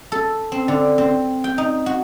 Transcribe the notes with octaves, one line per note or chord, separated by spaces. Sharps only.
A4
C4
D3
C4
G5
D#4
F#4